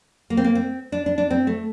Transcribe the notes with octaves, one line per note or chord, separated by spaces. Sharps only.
A#3
C4
A#3
C4
D4
D4
D4
C4
A3